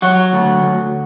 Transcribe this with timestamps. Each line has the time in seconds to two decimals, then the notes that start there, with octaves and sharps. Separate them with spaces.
0.02 F#3 F#4
0.33 D2
0.63 D2